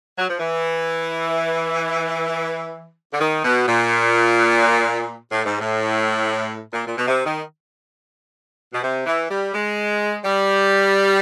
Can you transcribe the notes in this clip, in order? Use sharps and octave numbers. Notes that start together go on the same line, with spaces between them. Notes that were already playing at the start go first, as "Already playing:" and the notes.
F#3
F3
E3
D3
D#3
B2
A#2
A2
G#2
A2
A#2
A#2
B2
C3
D#3
B2
C3
E3
G3
G#3
G3